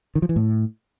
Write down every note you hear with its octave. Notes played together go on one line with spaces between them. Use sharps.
D#3
F3
E3
A2